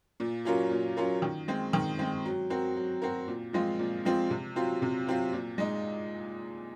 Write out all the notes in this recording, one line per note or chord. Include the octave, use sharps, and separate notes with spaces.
A#2
F#3 C#4 F4 A#4
A#2
F#3 C#4 F4 A#4
D#3
G#3 C4
D#3
G#3 C4
F#3
C4 F#4 A#4
F#3
C4 F#4 A#4
A#2
F3 G#3 C4 F4
A#2
F3 G#3 C4 F4
C3
F#3 C4 F4
C3
F#3 C4 F4
A#2
G#3 D#4